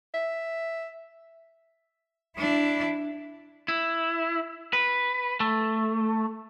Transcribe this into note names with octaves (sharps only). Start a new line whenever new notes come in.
E5
D4 E4
E4
B4
A3